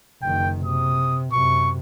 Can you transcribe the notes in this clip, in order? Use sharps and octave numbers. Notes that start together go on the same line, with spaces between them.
F#1 D#3 G5
C3 D#6
F#2 C3 C#6